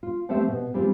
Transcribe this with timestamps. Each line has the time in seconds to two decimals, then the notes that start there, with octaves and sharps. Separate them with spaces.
0.03 F4
0.29 F3 A3 C4 G4 C5 E5
0.48 B2
0.74 E3 G3 G#3 C4 D4 F4